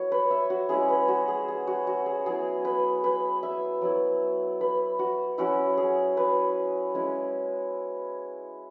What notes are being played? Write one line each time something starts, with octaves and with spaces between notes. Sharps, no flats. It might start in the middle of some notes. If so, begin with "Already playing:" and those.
Already playing: F#3 B3 E4 C#5
B4
E5
F#4
G#3 C#4 E4 G#4
B4
F#4
G#4
G#4
F#4
F#4
G#4
F#3 B3 E4 G#4
B4
B4
E5
F#3 B3 E4
B4
F#4
F#3 C#4 E4 F#4
G#4
B4
G#3 C#4 E4